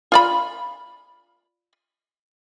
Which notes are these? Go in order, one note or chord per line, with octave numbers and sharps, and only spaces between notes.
F4 D5 B5